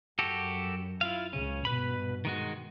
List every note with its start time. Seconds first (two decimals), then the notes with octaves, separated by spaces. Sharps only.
0.19 F#2 F#4 G4 A4
1.01 E4 F4 F5
1.33 C#2 C#3 C#4
1.65 G2 B2 B4 B5
2.25 D#3 G#3 F#4